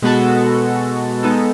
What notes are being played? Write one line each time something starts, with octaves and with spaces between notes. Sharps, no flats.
B2 G#3 B3 F#4 A4
G#3 B3 D#4 A4